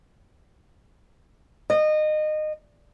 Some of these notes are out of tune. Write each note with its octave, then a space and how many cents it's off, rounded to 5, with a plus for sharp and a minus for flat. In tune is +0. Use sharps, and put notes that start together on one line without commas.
D#5 -25